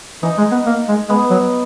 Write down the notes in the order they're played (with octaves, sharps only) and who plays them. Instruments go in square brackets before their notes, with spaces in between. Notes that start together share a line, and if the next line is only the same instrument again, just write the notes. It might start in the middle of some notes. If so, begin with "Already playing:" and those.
[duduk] E3 [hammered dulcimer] D#4
[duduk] G#3
B3
A#3
G#3
[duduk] G#3 [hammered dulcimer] B3
[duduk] F#3